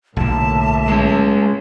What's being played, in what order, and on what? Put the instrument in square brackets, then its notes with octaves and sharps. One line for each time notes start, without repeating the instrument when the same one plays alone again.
[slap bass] B1 D3 [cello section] A2 A#3 E5 [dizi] A5
[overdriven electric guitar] G#3 C#4